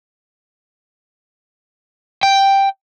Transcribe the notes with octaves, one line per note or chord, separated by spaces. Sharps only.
G5